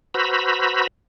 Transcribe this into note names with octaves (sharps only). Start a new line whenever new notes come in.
F#4 B4 C5 A#5 B5 E6